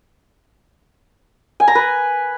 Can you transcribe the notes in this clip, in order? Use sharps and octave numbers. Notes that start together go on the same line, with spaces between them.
G#5
A#5
B4